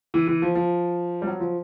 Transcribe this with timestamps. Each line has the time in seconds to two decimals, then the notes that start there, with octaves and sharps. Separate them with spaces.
0.14 E3
0.28 E3
0.42 F3
0.55 F3
1.22 G3
1.27 F#3
1.40 F3